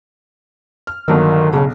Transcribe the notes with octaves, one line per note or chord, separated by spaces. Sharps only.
F6
G1 D#3 F#3 E6
B1 C#3